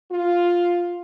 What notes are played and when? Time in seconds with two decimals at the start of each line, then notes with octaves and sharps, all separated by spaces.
0.11 F4